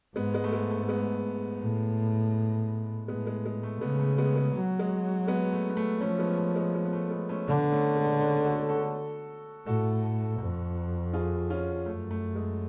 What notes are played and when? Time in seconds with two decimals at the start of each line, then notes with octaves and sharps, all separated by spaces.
0.16 G#2 G#3 B3
0.34 G#3 B3
0.44 A3
0.52 G#3
0.71 A3
0.83 A3
0.89 G#3 B3
1.62 A2
3.08 A2 G#3 B3
3.27 G#3
3.46 G#3
3.63 A3
3.81 C#3 G#3 B3
3.99 A3
4.18 G#3 B3
4.36 G#3
4.55 F#3
4.79 G#3
5.28 G#3 B3
5.53 A3
5.69 B3
5.77 A3
6.00 F3 A3 C#4
6.19 G#3 B3
6.38 A3
6.56 G#3
6.75 G#3
6.85 B3
6.93 A3
7.11 G#3 B3
7.29 A3 C#4
7.47 D3 B3 D4
7.71 A3 C#4
7.96 G#3 B3
8.21 A3 C#4
8.45 F#4 A4
8.69 F#4 A4
9.66 A2 F#4 A4
10.40 F2
11.13 F4 G#4
11.50 C#4 F4
11.86 F#2 A3
12.11 A3
12.35 G#3